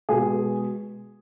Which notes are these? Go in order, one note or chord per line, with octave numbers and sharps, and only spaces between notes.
B2 G#3 G#4